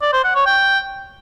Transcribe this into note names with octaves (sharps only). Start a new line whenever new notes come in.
D5
C5
F#5
C#5
G5